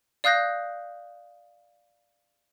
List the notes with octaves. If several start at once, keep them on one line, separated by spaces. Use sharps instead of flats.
D5 F5 D#6 F#6 G6 A#6